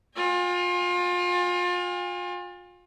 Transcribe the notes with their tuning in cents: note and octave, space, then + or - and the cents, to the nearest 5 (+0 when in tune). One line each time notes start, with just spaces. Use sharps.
F4 +30 G#5 -45